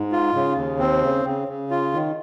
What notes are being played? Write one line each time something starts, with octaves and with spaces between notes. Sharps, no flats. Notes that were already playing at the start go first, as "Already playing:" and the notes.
Already playing: G#2
F4
C#3
D#2
C4
C#3
C#3
C#3
F4
D#3